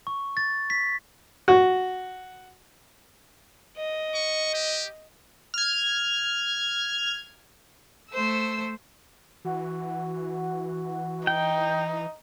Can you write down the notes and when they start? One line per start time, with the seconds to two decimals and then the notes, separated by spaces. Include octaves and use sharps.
0.07 C#6
0.37 A6
0.70 B6
1.48 F#4
3.78 D#5
4.15 C#6
4.54 G4
5.54 F6 G#6
8.12 A3 C5 E6
9.45 E3 F#4
11.27 D#4 G5